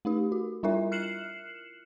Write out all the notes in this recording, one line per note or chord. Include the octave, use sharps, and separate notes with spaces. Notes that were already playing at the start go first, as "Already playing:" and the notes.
A3 D#4 G4
F#4
G3 D4 E4 F4 A#4 E5
F6 F#6 C7 C#7 E7 F#7